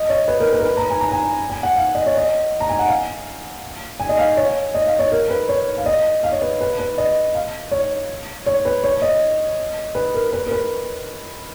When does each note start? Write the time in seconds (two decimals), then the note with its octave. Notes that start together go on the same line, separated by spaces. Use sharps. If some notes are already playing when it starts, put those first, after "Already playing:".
Already playing: D#5
0.09 C#5
0.28 B4
0.40 A#4
0.53 B4
0.61 A#4
0.65 B4
0.77 A#5
0.90 G#5
1.01 A#5
1.12 G#5
1.50 G#5
1.63 F#5
1.76 F5
1.95 D#5
2.06 C#5
2.17 D#5
2.60 A#5
2.69 G#5
2.79 F#5
2.88 F5
4.00 G#5
4.09 D#5
4.18 F5
4.37 C#5
4.74 D#5
4.87 F5
4.99 C#5
5.11 A#4
5.30 B4
5.49 C#5
5.78 F5
5.86 D#5
6.23 F5
6.32 C#5
6.41 B4
6.61 B4
6.79 B4
6.98 D#5
7.34 F5
7.71 C#5
8.46 C#5
8.65 B4
8.84 C#5
9.02 D#5
9.95 B4
10.14 A#4
10.33 B4
10.47 A#4
10.51 B4